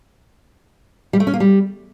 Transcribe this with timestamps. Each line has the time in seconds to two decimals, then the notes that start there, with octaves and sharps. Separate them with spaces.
1.13 G3
1.20 A3
1.27 C#4
1.34 A#3
1.40 G3